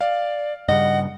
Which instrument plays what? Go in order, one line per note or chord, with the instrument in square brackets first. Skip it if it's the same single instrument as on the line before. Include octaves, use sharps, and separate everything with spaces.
[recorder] D5 [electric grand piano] F5
[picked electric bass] G2 C#3 G3 [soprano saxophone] D#5 [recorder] F#5